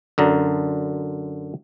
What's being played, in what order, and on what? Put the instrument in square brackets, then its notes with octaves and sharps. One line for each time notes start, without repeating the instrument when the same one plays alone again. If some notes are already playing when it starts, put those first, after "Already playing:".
[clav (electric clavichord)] F#2 D3 A#5